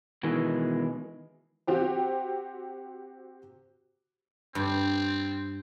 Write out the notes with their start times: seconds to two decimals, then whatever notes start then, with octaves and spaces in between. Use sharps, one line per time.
0.23 B2 D#3 E3 G#3
1.67 C4 F#4 G4 C5
4.55 G2 C4